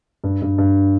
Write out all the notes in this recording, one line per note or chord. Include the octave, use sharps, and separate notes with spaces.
G2
G2
G2